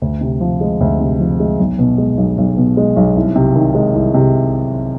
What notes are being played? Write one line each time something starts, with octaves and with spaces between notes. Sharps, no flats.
D2
C3
F3
G#3
D2
C3
F3
G#3
B1
B2
G#3
B1
B1
B2
G#3
B1
C2
C3
D#3
G#3
C2
C3